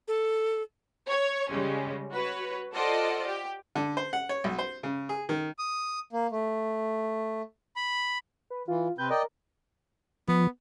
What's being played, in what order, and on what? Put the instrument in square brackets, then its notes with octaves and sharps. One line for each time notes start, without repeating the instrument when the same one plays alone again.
[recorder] A4
[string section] C#5 G#6
C#3 G3 G#3 C#4
F#4 B4 C#5
F4 A4 C5 D5 D#5 F#5
G4
[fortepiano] D3
C5
F#5
C#5
B1
C5
C#3
G#4
D#3
[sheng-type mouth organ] D#6
A#3
A3
B5
[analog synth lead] B4
[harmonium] E3 [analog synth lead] F4
[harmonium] C3 C4 B4 [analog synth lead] G6
[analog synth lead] A#4 [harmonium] D5 D#5 G5
[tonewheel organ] F3 [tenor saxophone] B3